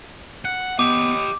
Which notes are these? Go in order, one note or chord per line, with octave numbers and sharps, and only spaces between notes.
F#5
B3 G4 D#5 D6